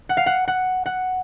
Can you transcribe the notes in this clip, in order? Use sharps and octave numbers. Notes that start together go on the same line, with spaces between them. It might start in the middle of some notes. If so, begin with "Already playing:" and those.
F#5
F5
F#5
F#5
F#5